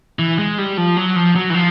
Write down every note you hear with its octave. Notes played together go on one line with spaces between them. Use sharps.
E3
G#3
G3
F3
F#3
F3
F#3
E3
F3